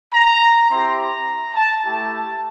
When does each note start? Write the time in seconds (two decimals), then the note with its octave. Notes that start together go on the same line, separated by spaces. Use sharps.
0.14 A#5
0.71 C4 E4 G4 C6
0.99 A#5
1.55 A5
1.83 A3 E4 G4 A5